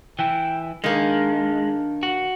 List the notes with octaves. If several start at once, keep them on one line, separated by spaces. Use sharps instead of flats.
E3 E4 G5
D#3 G#3 A#3 D4
F#4